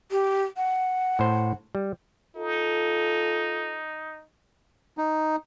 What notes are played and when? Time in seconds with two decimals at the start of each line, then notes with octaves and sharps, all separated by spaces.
0.11 G4
0.57 F#5
1.19 A2 C5
1.75 G3
2.36 D#4 F4 A4
4.98 D#4